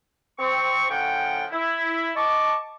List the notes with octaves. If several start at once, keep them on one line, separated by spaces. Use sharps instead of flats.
C4 C#6
A2 C#3 F3 F#5 G5
E4
D#5 A5 C#6 D6